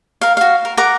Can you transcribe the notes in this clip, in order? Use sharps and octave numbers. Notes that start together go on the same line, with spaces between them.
A#4 F5
F#4 F5
A#4
A#4 F#5 D6